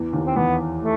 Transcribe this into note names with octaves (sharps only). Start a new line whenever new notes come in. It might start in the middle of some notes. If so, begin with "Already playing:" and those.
Already playing: E2 E3
D#2 D#3
C4
E2 E3 B3
A3